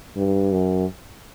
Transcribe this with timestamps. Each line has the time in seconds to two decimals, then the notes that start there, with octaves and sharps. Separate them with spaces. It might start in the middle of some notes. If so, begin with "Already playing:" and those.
0.16 G2
0.53 F#2